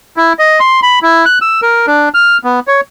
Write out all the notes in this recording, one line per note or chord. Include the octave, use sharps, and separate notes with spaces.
E4
D#5
C6
B5
E4
F#6
E6
A#4
D4
F6
B3
C#5